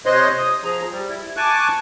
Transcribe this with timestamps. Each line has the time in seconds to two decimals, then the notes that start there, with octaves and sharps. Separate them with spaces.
0.06 C3 C5 C#5 D#5 C6 F#6
0.38 D#6
0.64 F3 G#4 A#5
0.91 G3
1.09 E4
1.37 G#5 A5 C#6 D6 F#6